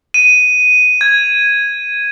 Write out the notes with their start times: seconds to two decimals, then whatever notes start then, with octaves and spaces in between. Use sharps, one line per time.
0.14 D#7
1.01 G#6